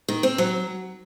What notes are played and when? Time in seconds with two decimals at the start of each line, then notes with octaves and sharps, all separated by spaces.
0.08 D#3
0.23 C4
0.38 F#3